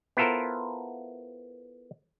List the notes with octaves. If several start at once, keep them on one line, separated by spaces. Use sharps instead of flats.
B3 E4 F4 A4 A#4 C5